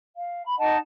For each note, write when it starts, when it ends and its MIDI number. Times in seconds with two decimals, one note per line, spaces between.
0.14 0.42 77
0.43 0.52 83
0.58 0.76 63
0.58 0.76 75
0.58 0.76 78
0.58 0.76 81